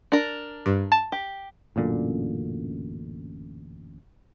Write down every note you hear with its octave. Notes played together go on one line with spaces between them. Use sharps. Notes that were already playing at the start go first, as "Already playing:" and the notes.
D4 A#4
G2
A5
G4
A1 F#2 A#2 D3